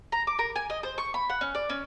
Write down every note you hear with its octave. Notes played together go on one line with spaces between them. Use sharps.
A#5
D6
A#4
G#5
D#5
C5
C#6
B5
F#5
C#4
D5
C#4